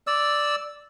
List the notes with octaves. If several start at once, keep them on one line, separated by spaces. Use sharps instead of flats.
D5 E6